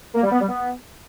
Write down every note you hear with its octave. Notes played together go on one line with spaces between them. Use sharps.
A#3
G3
B3
G3
B3